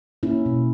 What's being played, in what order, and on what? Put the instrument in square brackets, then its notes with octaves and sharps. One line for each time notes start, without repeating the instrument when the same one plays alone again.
[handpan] A#3 C#4 E4
B2